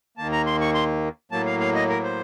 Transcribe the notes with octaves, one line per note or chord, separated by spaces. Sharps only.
D#2 D#3 A#3 A5
A#5
C6
C#6
C6
A2 F#3 A#3 A5
F5
F5
D#5
A#4
C5